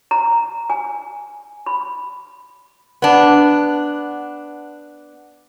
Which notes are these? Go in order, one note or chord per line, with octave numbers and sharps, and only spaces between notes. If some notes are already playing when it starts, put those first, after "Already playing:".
A#5
G#5
B5
B3 D4